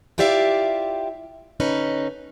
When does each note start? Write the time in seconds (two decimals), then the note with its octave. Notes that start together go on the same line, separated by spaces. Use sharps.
0.18 E4 F4 G4 D5 E5 F5
1.60 D3 C#4 D#4 B4